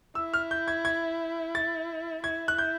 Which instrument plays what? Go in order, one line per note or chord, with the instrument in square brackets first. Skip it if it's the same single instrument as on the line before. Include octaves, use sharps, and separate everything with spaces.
[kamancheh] E4 [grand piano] E6
[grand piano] F6
G6
G#6
G#6
A6
[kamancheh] E4 [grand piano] G#6
[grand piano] F#6
G6